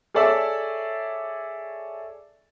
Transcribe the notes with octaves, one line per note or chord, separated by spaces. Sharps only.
G#4 A4 C#5 D5 E5 E6